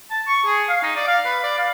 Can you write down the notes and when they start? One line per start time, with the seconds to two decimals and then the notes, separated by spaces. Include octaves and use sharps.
0.11 A5
0.27 C#6
0.46 G#4
0.69 F5
0.83 D#4
0.96 D5
1.07 F5
1.25 B4
1.44 D5
1.58 F5